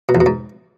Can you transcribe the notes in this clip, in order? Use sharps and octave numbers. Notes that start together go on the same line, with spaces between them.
B2
E2
B2
G#2